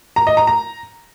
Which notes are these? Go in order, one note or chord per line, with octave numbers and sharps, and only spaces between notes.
A#5
D#5
A#5
A#5